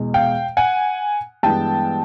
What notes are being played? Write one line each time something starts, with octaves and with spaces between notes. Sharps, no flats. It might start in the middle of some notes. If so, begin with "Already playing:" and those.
Already playing: E2 B2 G#3
F5 G5
F#5 G#5
G2 E3 G#3 B3 G5 A5